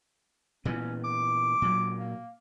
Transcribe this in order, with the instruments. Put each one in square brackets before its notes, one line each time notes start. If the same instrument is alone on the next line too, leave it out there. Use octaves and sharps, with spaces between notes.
[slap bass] A#2 E3 B3 [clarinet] C#4
[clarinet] D6
[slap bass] A#2 F#3
[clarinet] A#3